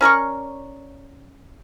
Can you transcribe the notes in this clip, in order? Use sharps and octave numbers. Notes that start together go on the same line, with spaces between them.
C#4 A#4 D5 C#6